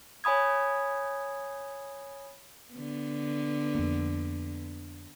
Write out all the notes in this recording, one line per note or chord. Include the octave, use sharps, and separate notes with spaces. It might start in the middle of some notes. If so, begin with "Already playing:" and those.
C#5 G#5 B5 D#6 G#6
D3 B3
F2 A#3